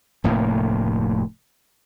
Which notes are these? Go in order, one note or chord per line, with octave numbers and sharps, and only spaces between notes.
F1 D2 A2 A#3